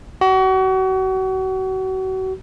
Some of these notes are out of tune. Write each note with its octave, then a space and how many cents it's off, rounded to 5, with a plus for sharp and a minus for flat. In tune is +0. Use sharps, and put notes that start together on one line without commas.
F#4 +35